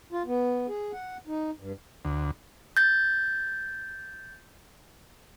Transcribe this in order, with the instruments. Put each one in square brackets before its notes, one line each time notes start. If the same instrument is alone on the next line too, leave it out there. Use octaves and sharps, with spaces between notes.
[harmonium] F4
B3
G#4
F#5
D#4
G2
[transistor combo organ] D2
[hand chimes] G6 A6